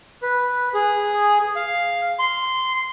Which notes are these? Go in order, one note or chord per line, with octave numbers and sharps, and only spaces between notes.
B4
G#4
F5
C6